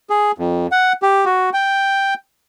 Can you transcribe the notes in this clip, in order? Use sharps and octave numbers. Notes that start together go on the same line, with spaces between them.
G#4
F2
F#5
G4
F#4
G5